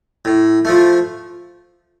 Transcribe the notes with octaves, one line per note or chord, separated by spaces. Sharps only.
A2
F3 A3